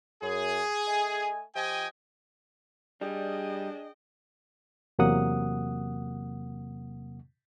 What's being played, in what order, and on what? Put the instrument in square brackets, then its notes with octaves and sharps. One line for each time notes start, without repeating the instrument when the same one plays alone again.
[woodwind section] F#2 [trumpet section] G#4
[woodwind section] A3 D#5 G#5
[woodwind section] F3 G4 [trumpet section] D#5 G5 G#5
[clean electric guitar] G3 [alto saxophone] D4 [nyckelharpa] G#4 [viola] D#5 G5
[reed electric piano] E2 C3 F#3 A#3 F#5 D#6